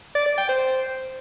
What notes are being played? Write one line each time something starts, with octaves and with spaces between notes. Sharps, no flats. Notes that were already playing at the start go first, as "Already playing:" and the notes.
D5
D5
G5
C5